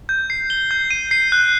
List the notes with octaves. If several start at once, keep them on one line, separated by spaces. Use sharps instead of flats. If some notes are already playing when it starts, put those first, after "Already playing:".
G6
C7
G7
G6
D#7
C7
F#6